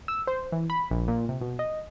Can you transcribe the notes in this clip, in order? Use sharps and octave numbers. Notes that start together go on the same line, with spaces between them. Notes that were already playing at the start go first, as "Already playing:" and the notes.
E6
C5
E3
B5
A#1
A#2
C3
B2
D#5